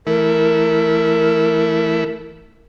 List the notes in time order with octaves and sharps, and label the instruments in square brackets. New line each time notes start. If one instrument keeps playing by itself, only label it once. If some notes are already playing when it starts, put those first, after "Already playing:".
[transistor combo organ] E3 A3 E4 [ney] A#4